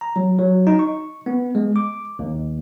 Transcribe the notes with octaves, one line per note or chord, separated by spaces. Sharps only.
A#5
F#3
F#3
D#4
C#6
B3
G#3
D6
D#2